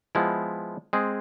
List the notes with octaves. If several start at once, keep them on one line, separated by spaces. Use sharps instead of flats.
F3 G#3 B3 E4
G#3 C4 G#4